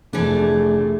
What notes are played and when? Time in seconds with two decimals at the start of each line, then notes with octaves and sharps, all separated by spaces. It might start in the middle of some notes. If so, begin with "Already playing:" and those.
0.13 F1 E3 A3 D4 G#4